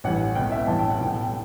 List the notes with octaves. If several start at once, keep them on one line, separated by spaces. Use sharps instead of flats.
A1 G2 E3 F#5
C#2 B2 G5
E5
A1 G2 E3 A5
G5
F#5
B1 A2 E3 G5
G5